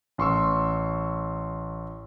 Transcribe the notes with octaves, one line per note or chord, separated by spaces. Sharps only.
A1 C6 C#6 E6